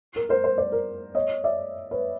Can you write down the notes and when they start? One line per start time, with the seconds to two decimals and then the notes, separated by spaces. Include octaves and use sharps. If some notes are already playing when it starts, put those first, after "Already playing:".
0.16 A#4
0.29 A#4 C5
0.44 A#4 C5
0.58 C5 D5
0.72 A#4
1.15 C#5 D#5
1.44 D5 E5
1.91 B4 C#5